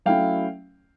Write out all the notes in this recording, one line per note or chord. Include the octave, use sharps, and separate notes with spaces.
F#3 A3 C#4 E4 F5 G5